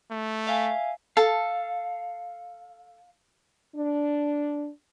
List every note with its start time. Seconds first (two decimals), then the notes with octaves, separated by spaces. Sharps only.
0.11 A3
0.47 E5 F5 G#5
1.17 A4 F5
3.75 D4